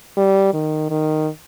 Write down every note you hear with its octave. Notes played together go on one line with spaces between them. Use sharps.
G3
D#3
D#3